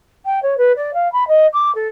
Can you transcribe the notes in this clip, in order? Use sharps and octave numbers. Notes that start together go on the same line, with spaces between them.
G5
C#5
B4
D5
F5
B5
D#5
D6
A4